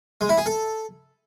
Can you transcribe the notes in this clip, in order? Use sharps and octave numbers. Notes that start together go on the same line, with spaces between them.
G#3
E4
G#4
A4